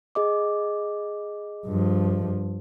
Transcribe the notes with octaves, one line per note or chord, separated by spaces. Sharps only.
G#4 D#5 D6
G2 F3